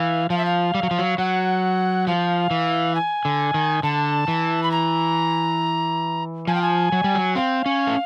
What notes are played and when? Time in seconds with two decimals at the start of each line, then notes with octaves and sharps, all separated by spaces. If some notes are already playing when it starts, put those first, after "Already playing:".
Already playing: E3 F5
0.30 F3 F5
0.38 E5
0.45 F5
0.74 G3
0.83 F#3
0.91 F3
0.99 F#3
1.18 F#3 F#5
2.07 F3 F5
2.51 E3
2.95 G#5
3.25 D3
3.54 D#3
3.83 D3 A5
4.28 E3
4.63 B5
4.71 A#5
6.47 F3 G#5
6.55 G5
6.62 G#5
6.92 F#3
7.04 G3
7.15 F#3
7.35 C4 F5
7.66 C#4
7.87 A3